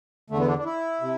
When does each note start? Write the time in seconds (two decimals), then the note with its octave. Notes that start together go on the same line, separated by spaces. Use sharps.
0.30 E2 D3 A3
0.39 B3
0.48 D4
0.58 D4
0.65 E4
1.01 C3